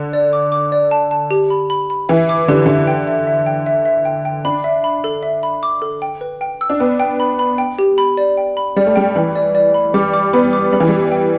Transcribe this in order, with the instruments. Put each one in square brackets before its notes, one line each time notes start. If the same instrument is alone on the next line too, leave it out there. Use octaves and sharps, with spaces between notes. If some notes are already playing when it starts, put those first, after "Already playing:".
Already playing: [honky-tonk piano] D3
[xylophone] D5
D6
D6
D5
A5
A5
G4
B5
B5
B5
[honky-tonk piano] E3 [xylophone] E5
[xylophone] D6
[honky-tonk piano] D3 [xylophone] G4
[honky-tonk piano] D3 [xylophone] E5
[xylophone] G5
E5
E5
G5
E5
E5
G5
G5
[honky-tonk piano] D4 [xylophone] B5
[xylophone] E5
B5
A4
E5
B5
D6
A4
G5
B4
G5
E6
[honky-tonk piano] D4
[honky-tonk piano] B3 [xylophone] G5
[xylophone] G5
B5
B5
G5
G4
B5
D5
G5
B5
[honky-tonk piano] G3 [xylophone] D5
[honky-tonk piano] A3
[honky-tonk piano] G3 [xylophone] G5
[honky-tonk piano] E3 [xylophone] B5
[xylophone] D5
D5
B5
[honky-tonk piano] G3 [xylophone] D6
[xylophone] D6
[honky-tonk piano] B3 [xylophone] B5
[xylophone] D6
[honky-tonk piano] G3 [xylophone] B5
[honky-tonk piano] E3
[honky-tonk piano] G3 [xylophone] G4
[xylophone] G5